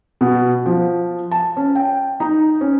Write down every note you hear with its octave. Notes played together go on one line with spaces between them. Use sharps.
B2
F3
A5
C#4
G5
D#4
C#4